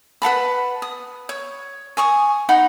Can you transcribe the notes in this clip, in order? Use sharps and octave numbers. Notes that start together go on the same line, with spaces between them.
B4 F#5 A5 B5
D#6
C#5
G#5 C#6 D#6
D#4 F#5 A#5 B5